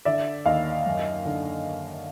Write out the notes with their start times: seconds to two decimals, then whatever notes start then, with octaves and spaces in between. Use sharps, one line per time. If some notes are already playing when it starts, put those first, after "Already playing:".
0.05 D3 D5 E5
0.45 D#2 D#5 F5
0.86 F#2
1.25 D3